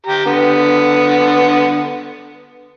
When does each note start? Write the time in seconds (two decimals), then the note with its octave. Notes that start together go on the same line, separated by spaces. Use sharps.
0.07 G4 A#5
0.26 D3 B3